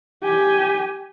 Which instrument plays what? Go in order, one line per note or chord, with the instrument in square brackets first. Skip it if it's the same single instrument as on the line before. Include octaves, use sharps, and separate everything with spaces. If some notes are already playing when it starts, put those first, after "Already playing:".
[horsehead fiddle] G4 G#5